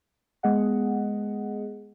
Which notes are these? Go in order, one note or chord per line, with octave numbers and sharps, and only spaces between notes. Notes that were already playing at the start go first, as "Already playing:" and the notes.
G#3 B3 G#4 D#5 F#5